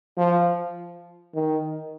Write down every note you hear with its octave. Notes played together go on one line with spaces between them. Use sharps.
F3
D#3